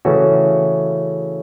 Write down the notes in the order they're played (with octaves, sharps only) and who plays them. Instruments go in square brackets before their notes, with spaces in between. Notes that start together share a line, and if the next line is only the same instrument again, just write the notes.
[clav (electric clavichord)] C#3 E3 A3 C#4 F#4